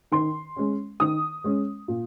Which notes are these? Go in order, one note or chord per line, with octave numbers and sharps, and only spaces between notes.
D#3 C6
G#3 C#4
D#3 D#6
G#3 C#4
A#2